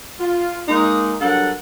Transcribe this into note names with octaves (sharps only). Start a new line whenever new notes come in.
F4
G#3 A#3 D#4
G2 F#3 A4 A#4 F#5